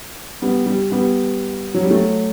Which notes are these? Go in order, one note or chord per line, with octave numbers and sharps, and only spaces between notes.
G3 B3
G3
G3 B3
F#3
G3
F#3 A3